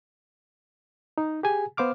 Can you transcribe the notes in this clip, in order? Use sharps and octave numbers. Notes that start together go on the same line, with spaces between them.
D#4
G4 G#4 G#5
B3 C5 F5 D6 F6